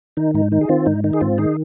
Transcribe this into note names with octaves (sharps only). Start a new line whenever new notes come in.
D#3 D#4
G#2 D#4
D#3 D#4
G#4
D#3 C4 F4
G#2 D#4
D#3 D#4
G#4
G#2 C4 F4
D#3 D#4 G#4